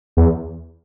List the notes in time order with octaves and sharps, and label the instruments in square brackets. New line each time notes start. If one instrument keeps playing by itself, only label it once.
[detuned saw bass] E2